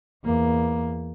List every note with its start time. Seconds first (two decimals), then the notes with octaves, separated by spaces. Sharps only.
0.24 E2 A#3